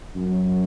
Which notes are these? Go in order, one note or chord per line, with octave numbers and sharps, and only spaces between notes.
F#2